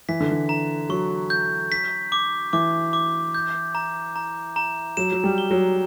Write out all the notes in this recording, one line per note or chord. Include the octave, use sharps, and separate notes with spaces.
E3 B6
D3
E3
A#5
F#3 C#6
G6
B6
D6
E3 D6
D6
G6
A#5
A#5
A#5
F#3 E7
F#3
G3
G7
F#3